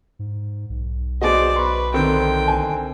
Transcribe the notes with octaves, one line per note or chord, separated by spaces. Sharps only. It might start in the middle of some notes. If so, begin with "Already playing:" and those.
G#2
B1
B3 F#4 G#4 C5 D5 D#5
B4 C6 C#6
D3 D#3 C4 G5
G#5